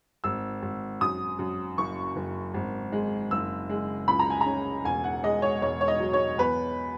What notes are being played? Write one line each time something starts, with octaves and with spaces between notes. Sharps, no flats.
G#1 E6
G#1
F#2 D#6
F#2
F#1 C#6
F#1
G#1
G#3
F#1 E6
G#3
C#2 B5
A#5
G#5
A#5
C#4
E1 G#5
F#5
G#3 D#5
C#5
E1 C#5
C#5
D#5
F#3
C#5
E2 B4